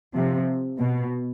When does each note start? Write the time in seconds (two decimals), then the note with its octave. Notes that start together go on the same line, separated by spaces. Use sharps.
0.14 C3 F3
0.79 B2